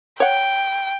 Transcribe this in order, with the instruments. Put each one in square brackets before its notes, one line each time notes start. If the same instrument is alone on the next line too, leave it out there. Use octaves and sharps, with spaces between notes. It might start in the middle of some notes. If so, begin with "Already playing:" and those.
[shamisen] C#5 F#5 [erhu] G5